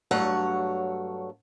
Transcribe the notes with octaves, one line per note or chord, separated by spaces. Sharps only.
G2 F#3 A3 C#5 F#5